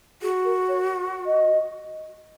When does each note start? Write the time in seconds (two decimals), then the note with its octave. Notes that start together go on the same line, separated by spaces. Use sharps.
0.22 F#4 G#4
0.45 A#4
0.69 C#5
1.26 D#5